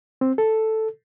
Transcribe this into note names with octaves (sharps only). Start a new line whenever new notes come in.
C4
A4